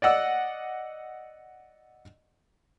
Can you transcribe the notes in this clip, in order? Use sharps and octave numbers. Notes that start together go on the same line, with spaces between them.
D5 D#5 F#5 E6